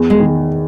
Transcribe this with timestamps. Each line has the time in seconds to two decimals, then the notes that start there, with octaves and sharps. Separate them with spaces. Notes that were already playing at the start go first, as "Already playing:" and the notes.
Already playing: E2
0.10 G#3
0.20 D#3